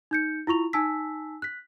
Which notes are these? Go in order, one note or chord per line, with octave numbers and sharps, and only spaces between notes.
D#4 G6 C#7
E4 F4 C#6 F7
D#4 G#5 A5 E6 B6
F#6 B6